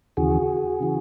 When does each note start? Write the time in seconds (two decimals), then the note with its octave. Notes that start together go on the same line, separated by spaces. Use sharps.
0.17 D#2 C#3 E3 F#4 G#4
0.80 C#3 E3